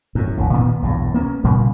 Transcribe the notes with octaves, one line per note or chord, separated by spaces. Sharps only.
F#2 A2
F1 D2
A#2 D#3 B3
B1 E2 G2
A#3 B3 C#4
A#2 C#3 G3